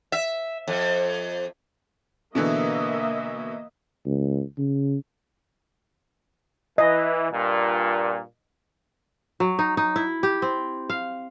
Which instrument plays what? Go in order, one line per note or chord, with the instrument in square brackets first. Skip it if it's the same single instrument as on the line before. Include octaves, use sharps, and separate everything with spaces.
[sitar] E5
F2
[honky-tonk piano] B2 D3 E3 [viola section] A#3 D#5 E5
[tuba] C#2
C#3
[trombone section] E3 [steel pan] D#5
[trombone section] G2 A#2
[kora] F#3
D#4
D#4
E4
G4
C4
F5